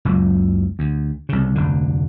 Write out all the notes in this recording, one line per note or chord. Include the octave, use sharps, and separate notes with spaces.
F#1 C#2 F#2
D2
C2 C#3
F1 D2 D3